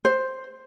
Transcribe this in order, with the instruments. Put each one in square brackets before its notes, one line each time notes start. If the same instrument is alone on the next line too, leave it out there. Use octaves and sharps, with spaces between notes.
[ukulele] C5